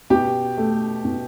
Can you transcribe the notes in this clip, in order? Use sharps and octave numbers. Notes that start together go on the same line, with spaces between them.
B2 G4
A3
B2